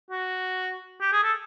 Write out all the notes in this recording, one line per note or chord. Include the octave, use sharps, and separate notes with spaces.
F#4
G4
G#4
A4